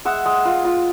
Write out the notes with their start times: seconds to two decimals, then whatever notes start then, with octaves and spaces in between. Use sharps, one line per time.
0.05 G#3 E5 F#5
0.26 G#3
0.45 F4
0.65 F4